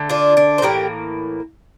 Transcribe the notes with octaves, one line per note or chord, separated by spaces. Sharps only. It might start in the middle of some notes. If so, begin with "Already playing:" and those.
Already playing: D3 A3
D4 F4
D4
C5
A2 E3 A#3 G4 A#4